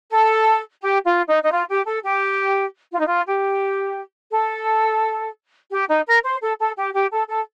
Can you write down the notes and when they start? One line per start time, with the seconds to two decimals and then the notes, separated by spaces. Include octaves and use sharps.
0.11 A4
0.81 G4
1.05 F4
1.28 D#4
1.43 D#4
1.52 F4
1.69 G4
1.86 A4
2.04 G4
2.92 F4
2.99 D#4
3.07 F4
3.26 G4
4.32 A4
5.71 G4
5.89 D#4
6.07 A#4
6.24 C5
6.41 A4
6.59 A4
6.77 G4
6.94 G4
7.12 A4
7.28 A4